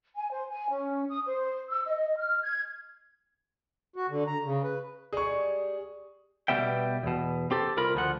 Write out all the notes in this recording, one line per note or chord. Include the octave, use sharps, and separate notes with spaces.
G#5
C5
G#5
C#4
D#6
C5
E6
D#5
F6
G#6
F#4
D3
A#5
C#3
B4
G3 G#3 G4 G#4 C#6
B2 D#3 G3 B3 E5 G5
E2 B2
C4 G4 A4
C2 F4 A#4 B5
D2 F3 F#5